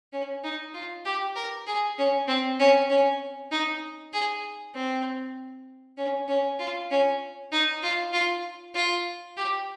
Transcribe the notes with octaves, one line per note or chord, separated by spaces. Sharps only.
C#4
D#4
F4
G4
A#4
G#4
C#4
C4
C#4
C#4
D#4
G#4
C4
C#4
C#4
F4
C#4
D#4
F4
F4
F4
G4